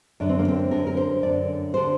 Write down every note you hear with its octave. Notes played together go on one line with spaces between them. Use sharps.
F#2 D3 D4
C4
A#3
C4
F#2 D3 A#4
A#4
C5
F#2 D3 D5
D3 C5